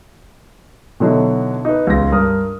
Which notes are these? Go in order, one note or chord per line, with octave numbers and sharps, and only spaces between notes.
B2 D3 F#3 D#4 E4
D#4 B4
C#2 A#6
G2 A#4 D#6